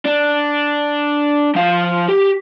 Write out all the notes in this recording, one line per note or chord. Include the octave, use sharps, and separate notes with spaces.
D4
F3 F5
G4